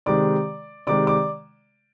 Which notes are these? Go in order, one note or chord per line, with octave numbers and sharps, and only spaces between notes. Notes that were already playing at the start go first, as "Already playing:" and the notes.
C3 D#3 G#3 D5 D6
C3 D#3 G#3 D5 D6
D5 D6